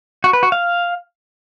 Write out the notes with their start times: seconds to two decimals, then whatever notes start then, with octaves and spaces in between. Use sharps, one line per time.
0.24 F#4
0.33 B4
0.43 F#4
0.52 F5